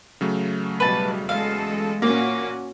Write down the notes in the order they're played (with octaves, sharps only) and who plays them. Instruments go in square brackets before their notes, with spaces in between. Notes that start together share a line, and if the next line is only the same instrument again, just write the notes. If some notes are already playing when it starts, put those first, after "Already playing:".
[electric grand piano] C#3 F#3 A3
[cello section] B2 G3 [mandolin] B4 A5
[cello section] E2 G#3 A4 [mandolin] F5
[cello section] A#2 C#4 F#4 [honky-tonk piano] A#3